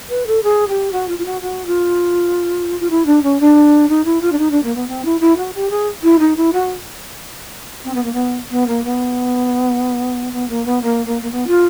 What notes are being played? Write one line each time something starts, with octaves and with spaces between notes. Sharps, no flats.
B4
A4
G#4
G4
F#4
F4
F4
F#4
F#4
F4
F4
E4
D4
C#4
D4
D#4
E4
F4
D4
D#4
D4
A#3
B3
C4
E4
E4
F#4
G4
G#4
E4
D#4
E4
F#4
C4
B3
A#3
B3
B3
A#3
B3
B3
A#3
B3
A#3
A#3
A#3
B3
F4